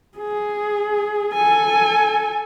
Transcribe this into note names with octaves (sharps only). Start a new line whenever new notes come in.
G#4
A4 G#5